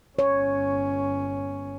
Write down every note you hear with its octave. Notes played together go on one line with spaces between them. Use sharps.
G1 C#4 C#5